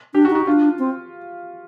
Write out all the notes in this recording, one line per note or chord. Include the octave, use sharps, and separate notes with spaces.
D4 G4
F#4
D#4
F#4
D4 F4
C4